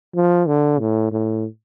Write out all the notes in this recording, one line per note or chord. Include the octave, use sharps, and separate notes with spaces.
F3
D3
A2
A2